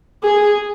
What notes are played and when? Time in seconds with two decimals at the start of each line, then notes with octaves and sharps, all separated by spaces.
0.23 G#4